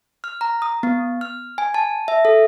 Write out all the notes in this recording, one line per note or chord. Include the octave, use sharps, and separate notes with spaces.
F6
A#5
D#6
B3
F6
G#5
A5
E5
A4